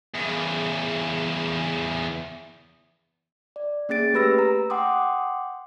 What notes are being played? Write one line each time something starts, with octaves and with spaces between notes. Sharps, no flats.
E2 C#3
D5
A#3 C#4 G#4 A6 D7
A3 G4 B4 B5 E6 A#6
A#5
F#5 G5 C6 D6 D#6